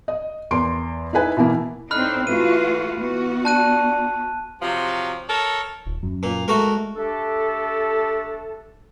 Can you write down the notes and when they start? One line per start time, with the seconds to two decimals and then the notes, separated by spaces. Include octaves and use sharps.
0.08 D#5
0.51 E2 A#4 C6 D7
1.13 D#4 E4 B4 G#5
1.37 B2 E3 A#3 E4
1.91 A2 C4 D4 D#4 B5 F6 F#6
2.27 E3 A3 F4 F#4 D#7
2.98 E3 B3 F#4
3.45 D4 A5 F#6 D#7
4.62 C3 F3 F#3
5.29 A4 A#4 C#5
5.85 D#1
6.03 F#2
6.23 A#2
6.48 G#3 A3 F#4 A#4
6.95 A3 D4 G4 A4